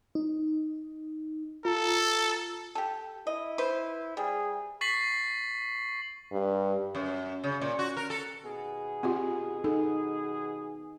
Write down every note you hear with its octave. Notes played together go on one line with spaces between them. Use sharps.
D#4
F4 A4 A#5
G4 A4
E4 D#5
B4 C5
G3 G#4
C#6 A6 B6 C7 F#7
G2
F#2
C#3
A#2
F#4
A#4
A4
D#2 B2 G#4
C4 F4 G4
D#4 A4